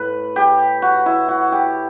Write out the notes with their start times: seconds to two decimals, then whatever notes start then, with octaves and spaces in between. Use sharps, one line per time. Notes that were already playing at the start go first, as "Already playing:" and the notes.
Already playing: A2 B4
0.36 G4
0.82 F#4
1.06 E4
1.28 F#4
1.52 G4